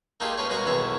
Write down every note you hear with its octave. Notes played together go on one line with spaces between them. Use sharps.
A3 A#3 D#4 F4 G4 G#4
C#4 A#4 B4 C#5
B2 G#3 F#4 G#4 A#4 A#5
B1 E2 D#3 E4 C#5